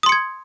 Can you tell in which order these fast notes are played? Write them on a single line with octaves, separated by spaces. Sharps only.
D#6 C6 C#7 G#6